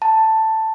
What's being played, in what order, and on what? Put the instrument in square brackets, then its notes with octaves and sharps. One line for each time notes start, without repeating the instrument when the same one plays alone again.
[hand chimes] A5